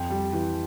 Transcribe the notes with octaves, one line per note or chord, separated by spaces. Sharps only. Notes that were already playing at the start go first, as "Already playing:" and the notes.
Already playing: F2 G5
G3
E3